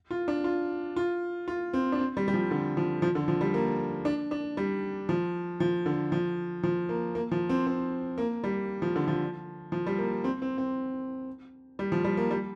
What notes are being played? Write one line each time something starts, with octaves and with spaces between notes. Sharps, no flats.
F4
D4
F4
F4
F4
C4
D4
C4
G3
G3
F3
D3
F3
F3
D3
F3
G3
A#3
D4
D4
G3
F3
F3
D3
F3
F3
A#3
A#3
F3
C4
C4
A#3
G3
F3
D3
F3
F3
G3
A#3
C4
C4
C4
G3
F3
G3
A#3
G3